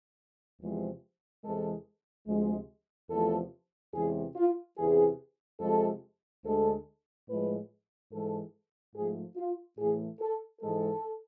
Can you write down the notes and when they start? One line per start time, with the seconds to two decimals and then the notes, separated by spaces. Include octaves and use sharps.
0.60 E2 C3 F3 G#3
1.43 E2 C3 E3 G#3 A4
2.27 D2 C3 F3 G#3
3.10 E2 C3 F3 A3 A4
3.94 E2 C3 E3 G#3 G#4
4.36 F4
4.77 E2 C3 E3 G#4
5.61 F2 C3 F3 G#3 A4
6.44 D2 D3 G#3 A4
7.28 A2 F3 G#3 B4
8.11 G#2 E3 G#3 A4
8.95 G#2 F3 A3 G#4
9.36 F4
9.78 A2 E3 A3 G#4
10.20 A4
10.61 G#2 E3 G#3 A4